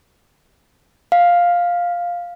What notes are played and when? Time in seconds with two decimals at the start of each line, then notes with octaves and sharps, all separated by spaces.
1.12 F5